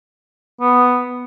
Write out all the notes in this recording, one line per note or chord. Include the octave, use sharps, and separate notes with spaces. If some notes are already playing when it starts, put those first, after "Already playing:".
B3